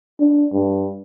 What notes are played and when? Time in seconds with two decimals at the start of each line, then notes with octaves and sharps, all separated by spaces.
0.20 D4
0.53 G2